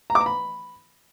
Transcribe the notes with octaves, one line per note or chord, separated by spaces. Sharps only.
A#5
D6
A#5
B5